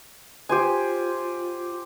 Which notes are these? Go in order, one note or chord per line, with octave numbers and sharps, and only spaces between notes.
F4 G4 C5 G#5